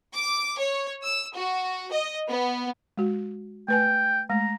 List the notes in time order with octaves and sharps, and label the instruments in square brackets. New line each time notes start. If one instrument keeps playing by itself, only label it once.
[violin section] D6
C#5
E6
F#4
D#5
B3
[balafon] G#3 F#4
[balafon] A3 B4 G#5 [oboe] G5
[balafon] G#3 A3 [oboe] A#5